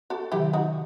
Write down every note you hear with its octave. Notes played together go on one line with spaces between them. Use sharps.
F#4 A4
C3 D#3 F#3 E4 G4
D#4 F#4